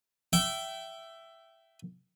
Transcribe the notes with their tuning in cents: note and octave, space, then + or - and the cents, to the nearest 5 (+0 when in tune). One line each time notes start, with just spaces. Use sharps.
E5 +10 G5 -20